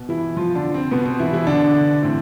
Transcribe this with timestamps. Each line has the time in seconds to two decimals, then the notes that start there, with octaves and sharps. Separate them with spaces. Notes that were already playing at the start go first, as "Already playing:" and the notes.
Already playing: B2
0.09 E3 E4
0.37 F3 F4
0.55 D3 D4
0.74 C4
0.91 B2 B3
1.06 C4
1.20 E3 E4
1.33 E3 E4
1.47 D3 D4
2.02 A2 E3 C4